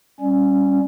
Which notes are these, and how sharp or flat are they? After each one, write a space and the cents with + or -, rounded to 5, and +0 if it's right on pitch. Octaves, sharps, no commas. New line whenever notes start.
G3 +5 C#4 +0